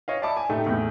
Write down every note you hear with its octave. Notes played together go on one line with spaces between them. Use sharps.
C#5 D#5 F5
D5 E5 A5 B5 D6
G#5
A2 A3 D#4 G4
E2 A2